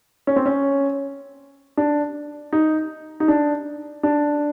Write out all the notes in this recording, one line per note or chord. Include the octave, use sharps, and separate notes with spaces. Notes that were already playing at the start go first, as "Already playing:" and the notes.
C#4
C4
C#4
D4
D#4
D#4
D4
D4